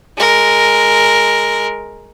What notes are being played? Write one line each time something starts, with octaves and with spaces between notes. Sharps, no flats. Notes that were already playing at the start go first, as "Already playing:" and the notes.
G#3 A#4